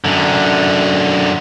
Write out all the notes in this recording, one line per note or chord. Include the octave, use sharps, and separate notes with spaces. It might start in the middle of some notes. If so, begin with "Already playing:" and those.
F#2 D3